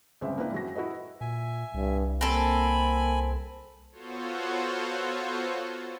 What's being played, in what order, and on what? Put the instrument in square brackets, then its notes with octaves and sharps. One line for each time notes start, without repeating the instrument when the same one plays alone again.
[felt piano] G1 C#2 G#3 C4 C#4 E5
A#3 D4 E4 B4 G5
F#2 F#3 A#6
E4 F#4 A4 B4 D#5
[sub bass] A#2 [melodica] E5 G#5
[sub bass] C2 [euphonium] G2
[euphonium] A#3 [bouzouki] C4 A4 [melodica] G#5 B5
[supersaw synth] B3 F4 F#4 A4 C5 C#5